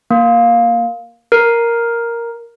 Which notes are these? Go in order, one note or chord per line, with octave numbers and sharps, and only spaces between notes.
A#3
A#4